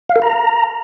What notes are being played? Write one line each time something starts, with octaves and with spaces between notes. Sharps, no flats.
F5
A#4
A#5